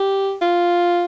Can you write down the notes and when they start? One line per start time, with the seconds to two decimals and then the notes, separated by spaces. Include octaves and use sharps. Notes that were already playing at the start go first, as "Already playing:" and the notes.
Already playing: G4
0.41 F4